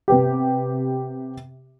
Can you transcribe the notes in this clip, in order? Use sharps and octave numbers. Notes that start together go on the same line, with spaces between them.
C3 B3 G4